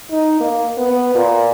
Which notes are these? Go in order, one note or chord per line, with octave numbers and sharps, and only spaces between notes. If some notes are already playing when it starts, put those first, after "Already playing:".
D#4
A#3
B3
A#2